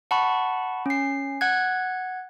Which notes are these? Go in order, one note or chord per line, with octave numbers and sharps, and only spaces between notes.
F#5 A5 B5 C#6
C#4 C7
F#5 F#6 G#6